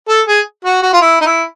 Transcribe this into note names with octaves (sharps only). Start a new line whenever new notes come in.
A4
G#4
F#4
F#4
F4
E4
D#4
E4